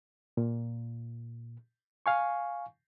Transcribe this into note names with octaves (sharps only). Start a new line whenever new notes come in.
A#2
F5 G#5 C#6